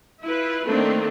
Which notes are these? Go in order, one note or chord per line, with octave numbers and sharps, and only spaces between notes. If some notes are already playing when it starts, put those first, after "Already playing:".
E4 F4 B4
D#3 A3 A#3 C4 D4 D#4